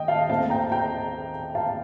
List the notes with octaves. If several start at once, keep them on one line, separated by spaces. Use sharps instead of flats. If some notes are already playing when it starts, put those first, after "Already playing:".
Already playing: D#2 D#5 G5
F5 A5
A#2 A3 C4 F5 A5
G5 A#5
G5 A#5
F5 A5